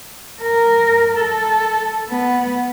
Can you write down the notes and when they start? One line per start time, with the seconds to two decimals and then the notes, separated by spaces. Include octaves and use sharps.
0.42 A#4
1.17 A4
2.09 B3